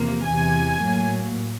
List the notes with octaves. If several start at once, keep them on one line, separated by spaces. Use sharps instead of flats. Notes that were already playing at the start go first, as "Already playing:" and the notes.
Already playing: E2 C3 F3 A#3
E2 C3 E3 G#5
A2 F#3 A#3